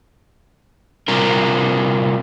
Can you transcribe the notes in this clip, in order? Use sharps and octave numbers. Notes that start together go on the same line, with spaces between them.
C3 G3 C4 F4 A#4